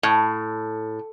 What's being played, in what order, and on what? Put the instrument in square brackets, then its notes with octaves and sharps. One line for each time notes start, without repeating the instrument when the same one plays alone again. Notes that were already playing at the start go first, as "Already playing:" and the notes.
[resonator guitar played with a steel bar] A2